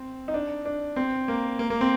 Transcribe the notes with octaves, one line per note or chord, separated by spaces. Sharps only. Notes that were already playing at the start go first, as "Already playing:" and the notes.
Already playing: C4
D#4
D4
D4
C4
A#3
A#3
A#3
C4